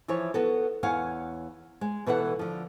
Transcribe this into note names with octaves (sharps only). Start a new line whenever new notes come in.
E3 F3 E4 C#5
B3 F#4 A4
E2 C#5 F5 F#5 G#5
G#3
B2 E3 A4 E5 F#5
D3 F3